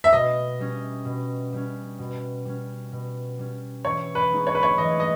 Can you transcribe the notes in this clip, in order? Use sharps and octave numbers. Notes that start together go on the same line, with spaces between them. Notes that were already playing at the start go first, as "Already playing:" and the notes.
E5
B2 D#5
G3 C#4
B2
G3 C#4
B2
G3 C#4
B2
G3 C#4
E3 C#5
B4
G#3 B3 D#4
C#5
B4
C#5
E3 D#5
D#5